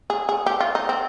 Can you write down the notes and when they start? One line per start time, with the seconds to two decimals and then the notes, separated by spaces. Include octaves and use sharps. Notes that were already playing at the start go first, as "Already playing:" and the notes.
0.10 G#4
0.29 G#4
0.46 G4
0.60 F4
0.75 D#4
0.89 C4